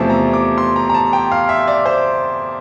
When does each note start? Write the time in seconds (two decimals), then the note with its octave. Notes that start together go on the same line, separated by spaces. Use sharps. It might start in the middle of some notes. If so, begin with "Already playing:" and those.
Already playing: E2 C3 F3 A3 A5
0.10 A#5
0.33 D6
0.58 C6
0.76 A#5
0.90 A#5
0.94 A5
1.13 G5
1.32 F5
1.49 E5
1.68 D5
1.86 C5